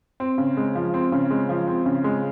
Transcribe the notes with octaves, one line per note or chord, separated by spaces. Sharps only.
C4
C#3
G#3
F3
C4
C#3
G#3
F3
C4
C#3
G#3